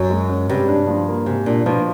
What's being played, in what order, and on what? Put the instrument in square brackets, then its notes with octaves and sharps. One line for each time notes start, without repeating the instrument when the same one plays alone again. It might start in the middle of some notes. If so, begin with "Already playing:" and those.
Already playing: [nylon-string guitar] F#2 [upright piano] F#4
[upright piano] G#3
C#4
[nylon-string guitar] G2 [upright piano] C3
[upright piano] D4
F3
A#3
[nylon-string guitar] G#2 [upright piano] C3
[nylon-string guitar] A#2 [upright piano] D4
[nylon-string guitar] B2 [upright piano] F3